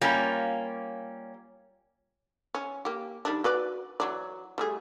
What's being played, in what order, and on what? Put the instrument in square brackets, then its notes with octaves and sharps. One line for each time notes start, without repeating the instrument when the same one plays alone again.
[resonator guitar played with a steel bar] G3 A#3 C#4 F4
[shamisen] C#4
A#3 G4
D#3 G3 D4
F#4 B4 D5
E3 F#3 D5
G3 A3 G#4